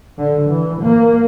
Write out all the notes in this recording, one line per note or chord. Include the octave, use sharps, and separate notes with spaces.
D3
E3
A#3